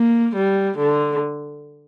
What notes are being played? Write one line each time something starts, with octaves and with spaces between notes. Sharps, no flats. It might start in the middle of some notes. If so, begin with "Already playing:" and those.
Already playing: A#3
G3
D3